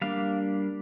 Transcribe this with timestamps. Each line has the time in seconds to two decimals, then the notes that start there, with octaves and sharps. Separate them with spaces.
0.02 G3 A#3 D4 F5